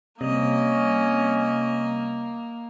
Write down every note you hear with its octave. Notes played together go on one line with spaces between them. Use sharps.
C3 G3 A#3 C#4 D#5